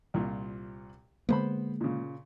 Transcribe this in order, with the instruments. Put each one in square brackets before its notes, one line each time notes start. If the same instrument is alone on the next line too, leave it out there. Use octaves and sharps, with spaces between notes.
[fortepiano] C2 A#2 F4
[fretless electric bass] D3 G#3 A#3 [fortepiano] B3 C5 B5
[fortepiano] A#2 C#3